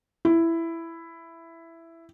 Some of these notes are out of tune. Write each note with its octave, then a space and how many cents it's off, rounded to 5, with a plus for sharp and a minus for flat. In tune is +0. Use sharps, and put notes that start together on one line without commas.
E4 +10